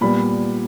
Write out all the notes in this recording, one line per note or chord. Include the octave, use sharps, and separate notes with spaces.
A#2 G3 B3 B5